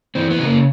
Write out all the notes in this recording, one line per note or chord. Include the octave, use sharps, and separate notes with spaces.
E3 C4
B3
C#3
A#3